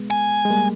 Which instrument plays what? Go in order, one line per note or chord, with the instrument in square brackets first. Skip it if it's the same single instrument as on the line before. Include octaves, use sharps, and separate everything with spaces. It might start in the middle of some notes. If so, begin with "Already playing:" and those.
Already playing: [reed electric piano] G#3 B3
[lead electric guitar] G#5
[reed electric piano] G#3
G3 A#3